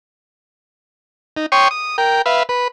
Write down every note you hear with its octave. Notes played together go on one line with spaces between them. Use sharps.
D#4
C#5 G5 C6 C#6 D#6
D#6
A#4 G5
B4 E5 F5
B4